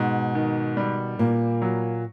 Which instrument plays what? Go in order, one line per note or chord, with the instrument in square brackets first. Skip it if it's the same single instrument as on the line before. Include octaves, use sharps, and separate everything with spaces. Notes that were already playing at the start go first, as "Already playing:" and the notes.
Already playing: [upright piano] G#2 [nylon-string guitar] B2
[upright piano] D#3
G3
[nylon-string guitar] A#2 [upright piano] A#3
[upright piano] F#3